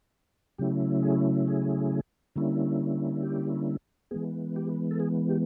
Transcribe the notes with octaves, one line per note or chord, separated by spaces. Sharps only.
C#3 F#3 A3 C#4 E4 G4
G#4
G#4
D3 G3 A#3 C#4 E4
G4
E3 G#3 B3 G#4
G4
A4
G#4
G4